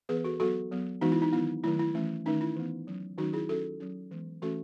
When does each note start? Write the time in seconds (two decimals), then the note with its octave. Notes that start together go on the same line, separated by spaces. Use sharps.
0.09 E3 B3 G#4 B4
0.24 F#4 A4
0.40 F#3 B3 F#4 A4
0.71 F#3 B3
1.01 E3 G#3 B3 D#4 F#4
1.12 E4
1.22 D#4
1.32 D#3 F#3 B3 E4
1.63 D#3 F#3 A3 E4
1.79 E4
1.94 E3 A3 C#4
2.26 D#3 A3 C#4 D#4
2.41 E4
2.56 E3 B3
2.87 F#3 C#4
3.18 D#3 F#3 A3 C#4 D#4 F#4
3.33 E4 G#4
3.49 F#3 C#4 F#4 A4
3.80 F#3 C#4
4.11 E3 G#3 B3
4.42 E3 A3 C#4 F#4 A4